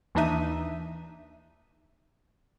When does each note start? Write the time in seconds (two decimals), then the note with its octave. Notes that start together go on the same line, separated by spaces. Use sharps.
0.15 D#2 E3 D4 D#4 E5 D#7